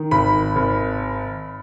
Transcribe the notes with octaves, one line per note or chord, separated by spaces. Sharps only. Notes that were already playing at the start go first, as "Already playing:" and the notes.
Already playing: D#3
G#1 B5
G#1